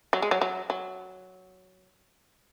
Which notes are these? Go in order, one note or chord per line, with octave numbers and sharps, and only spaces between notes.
F#3
G#3
F#3
F#3
F#3